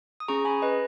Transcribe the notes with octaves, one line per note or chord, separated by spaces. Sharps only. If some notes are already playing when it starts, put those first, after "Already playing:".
D#6
C#4 G#4 A#5 C#6
G#5 B5
B4 D#5